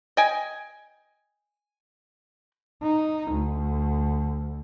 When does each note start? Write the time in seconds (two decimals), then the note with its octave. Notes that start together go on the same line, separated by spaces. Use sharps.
0.17 D#5 G5 G#5
2.83 D#4
3.32 D2